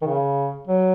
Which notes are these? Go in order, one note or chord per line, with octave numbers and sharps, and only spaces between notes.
D#3
C#3
F#3